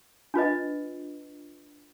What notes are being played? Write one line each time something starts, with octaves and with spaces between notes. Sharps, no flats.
D4 F4 B4 D#5